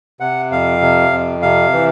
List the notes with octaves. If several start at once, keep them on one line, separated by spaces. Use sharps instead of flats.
C3 F#5
F2 F5
C3
F2
C3 F5
E3